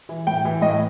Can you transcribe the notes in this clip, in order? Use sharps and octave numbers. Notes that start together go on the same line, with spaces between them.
E3
A2 G5
E3
A2 D#5